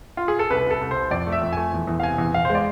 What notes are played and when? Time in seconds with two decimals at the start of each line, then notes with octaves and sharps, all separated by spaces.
0.17 F4
0.28 G#4
0.39 A4
0.50 C2 B4
0.66 C2 A4
0.81 C2
0.91 C5
0.96 C2
1.11 F2 D5
1.27 A3
1.32 E5
1.41 F2
1.53 A3 G#5
1.73 E2
1.87 E2
2.00 F5
2.03 C3 G#5
2.18 E2
2.34 E2 F5
2.45 G#3 C5
2.55 D5